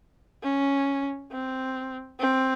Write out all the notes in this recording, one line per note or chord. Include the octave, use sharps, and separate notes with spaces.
C#4
C4
C4